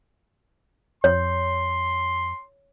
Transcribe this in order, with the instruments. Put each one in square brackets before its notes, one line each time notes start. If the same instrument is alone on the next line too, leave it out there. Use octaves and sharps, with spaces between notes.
[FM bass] F2 [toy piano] C#5 [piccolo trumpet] C6